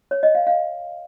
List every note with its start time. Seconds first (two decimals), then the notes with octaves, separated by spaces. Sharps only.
0.11 C#5
0.23 D#5
0.35 F5
0.47 F5